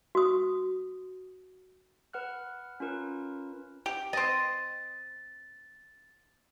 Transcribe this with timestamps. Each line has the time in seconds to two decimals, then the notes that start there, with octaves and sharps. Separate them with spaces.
0.15 F#4 D#6
2.13 B4 F#5 F6 F#6
2.80 C#4 F4 A#4 B4
3.86 G4
4.13 C4 D#5 A6